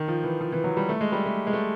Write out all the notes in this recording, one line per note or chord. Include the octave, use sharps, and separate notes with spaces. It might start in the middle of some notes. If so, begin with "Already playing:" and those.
Already playing: D#3
F3
E3
F3
E3
F#3
G3
A3
G#3
G3
A3
G#3
A3